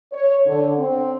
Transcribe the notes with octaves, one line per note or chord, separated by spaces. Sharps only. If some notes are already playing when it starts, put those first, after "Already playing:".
C#5
D3
C4